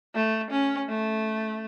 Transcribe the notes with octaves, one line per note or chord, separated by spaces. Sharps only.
A3
C#4
A3